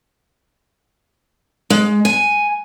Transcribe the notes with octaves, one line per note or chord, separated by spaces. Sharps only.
G#3
G#5